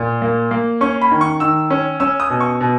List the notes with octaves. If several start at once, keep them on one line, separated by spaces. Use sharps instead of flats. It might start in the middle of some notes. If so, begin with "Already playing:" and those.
Already playing: A#2
A#3
A#3
C#4 C#6
B5
D#3
C#6
D#3 E6
C#4
C#4 E6
D#6
B2
C#6
B2